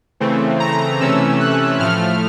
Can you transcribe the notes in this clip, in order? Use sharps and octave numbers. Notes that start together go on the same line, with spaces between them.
C#3 E3 A3 C4
A#5
C3 E3 A3 C#4 E6
F#6
A2 F3 A3 F6